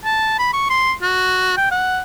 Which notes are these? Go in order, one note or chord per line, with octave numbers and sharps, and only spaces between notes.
A5
B5
C#6
C6
F#4
G5
F#5